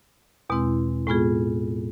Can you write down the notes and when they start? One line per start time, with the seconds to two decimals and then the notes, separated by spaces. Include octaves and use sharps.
0.50 E2 B2 G#3 C4 E4
1.07 A2 G#3 B3 F4 G#4